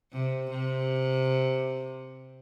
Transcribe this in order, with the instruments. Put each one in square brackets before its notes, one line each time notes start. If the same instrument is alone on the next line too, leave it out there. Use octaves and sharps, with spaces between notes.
[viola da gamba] C3
C3